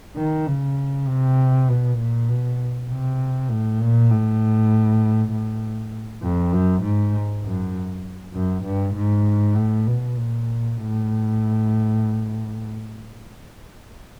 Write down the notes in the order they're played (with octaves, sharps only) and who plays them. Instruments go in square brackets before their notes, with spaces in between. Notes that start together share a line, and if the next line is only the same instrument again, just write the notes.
[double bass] D#3
C#3
C3
B2
A#2
B2
C3
A2
A#2
A2
A2
F2
F#2
G#2
F#2
F#2
G2
G#2
A2
B2
A#2
A2